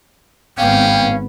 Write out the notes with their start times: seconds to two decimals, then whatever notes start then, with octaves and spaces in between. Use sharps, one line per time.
0.58 G#1 B3 C#4 F5 G5